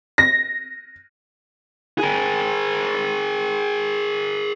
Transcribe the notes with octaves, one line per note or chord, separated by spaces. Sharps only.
A#6
G#4 A#4